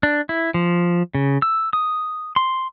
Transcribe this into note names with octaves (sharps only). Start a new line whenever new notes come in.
D4
E4
F3
C#3
E6
D#6
C6